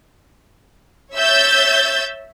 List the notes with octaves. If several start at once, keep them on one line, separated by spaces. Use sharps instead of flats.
C#5 E5 E6 G6 A6